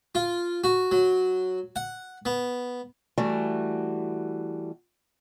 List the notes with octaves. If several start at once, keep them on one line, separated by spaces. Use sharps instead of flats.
F4
F#4
F#3
F#5
B3
E3 G3 A3 F#4